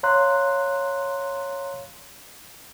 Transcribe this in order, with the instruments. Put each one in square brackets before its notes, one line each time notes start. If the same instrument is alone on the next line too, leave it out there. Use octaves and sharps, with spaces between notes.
[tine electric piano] C#5 F5 A#5 C6 F#6